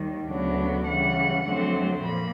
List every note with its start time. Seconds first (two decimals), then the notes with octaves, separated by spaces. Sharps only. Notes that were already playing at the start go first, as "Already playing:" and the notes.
Already playing: D#2 D#3 G3
0.29 D2 C#3 F#3 B3 D4
0.86 C#3 E3 G3 F#5
1.45 F2 D3 F#3 A3 C4
2.02 A#2 F3 A#3 B5